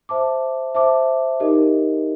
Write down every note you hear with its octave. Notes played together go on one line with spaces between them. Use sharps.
C5 E5 A5 D6
C5 E5 A5 D6
D#4 G4 A#4 D#5